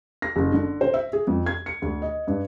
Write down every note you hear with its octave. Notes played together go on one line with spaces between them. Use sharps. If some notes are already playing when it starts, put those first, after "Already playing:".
A#6
F#1
D3
C5
E5
G#4
F2
G#6
C#7
D2
D#5
G2